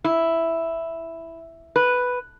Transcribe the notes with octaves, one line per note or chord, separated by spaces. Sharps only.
E4
B4